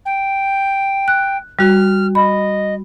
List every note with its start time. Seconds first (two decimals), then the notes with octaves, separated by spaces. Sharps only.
0.05 G5
1.08 F#6
1.59 G3 F#4 F6
2.15 D#5 B5